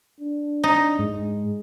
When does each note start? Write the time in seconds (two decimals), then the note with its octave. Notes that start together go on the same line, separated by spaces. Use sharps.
0.20 D4
0.64 D#4
0.99 G#2 G#3